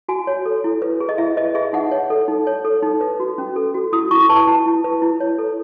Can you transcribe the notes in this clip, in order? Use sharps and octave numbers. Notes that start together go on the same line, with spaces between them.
F#4 G#5
C#5
A4
E4
B4
G#4
D#5
E4 E5
B4 D#5
G#4 E5
D#4 F#5
C#5
A4
D#4
C#5
A4
D#4
B4
F#4
C#4
A4
F#4
E4 D#6
E4 C#6
B4 A5
E4 A5
E4
B4
E4
C#5
A4